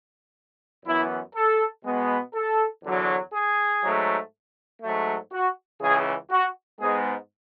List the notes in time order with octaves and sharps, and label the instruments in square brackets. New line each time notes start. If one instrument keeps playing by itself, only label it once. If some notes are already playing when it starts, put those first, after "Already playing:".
[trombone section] F#2 E3 B3 E4
A4
B2 G#3 B3
A4
E2 D3 F#3
G#4
G#2 F#3 A3
G#2 F#3 A3
F#4
C#2 C#3 E3 G#4
F#4
G#2 G#3 B3 G#4